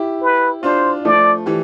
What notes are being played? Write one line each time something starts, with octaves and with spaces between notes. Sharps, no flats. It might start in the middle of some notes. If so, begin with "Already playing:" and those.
Already playing: E4 G4
B4
D4 F4 C5
F3 A3 D5
E3 G3